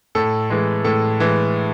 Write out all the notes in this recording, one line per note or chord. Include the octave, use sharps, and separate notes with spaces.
A2 A4
E3 G#3
A2 A4
E3 G#3